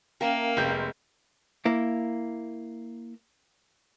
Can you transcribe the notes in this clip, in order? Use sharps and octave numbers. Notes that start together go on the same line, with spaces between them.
A#3 C#4 A#4 E5 F5 G5 A5
F1 G#3 C4 G6
A#3 E4